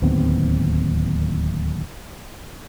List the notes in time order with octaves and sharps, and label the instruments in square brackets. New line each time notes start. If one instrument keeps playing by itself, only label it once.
[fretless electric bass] D1 D#2 B3 C4